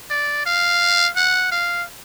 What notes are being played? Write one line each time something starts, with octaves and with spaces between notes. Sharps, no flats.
D5
F5
F#5
F5